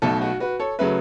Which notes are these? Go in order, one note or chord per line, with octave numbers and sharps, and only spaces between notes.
B1 B2 A3 A4
F#4
F#4 B4
A4 C#5
C#3 F#3 A3 B4 E5